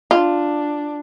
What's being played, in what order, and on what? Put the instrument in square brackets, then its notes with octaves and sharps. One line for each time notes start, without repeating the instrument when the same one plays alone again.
[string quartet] D4 [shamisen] F4